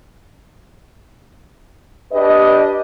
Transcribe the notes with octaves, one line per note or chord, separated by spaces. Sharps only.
D4 G4 B4 D#5